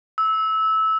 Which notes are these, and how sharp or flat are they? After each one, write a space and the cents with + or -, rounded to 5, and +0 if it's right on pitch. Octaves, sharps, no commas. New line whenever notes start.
E6 -20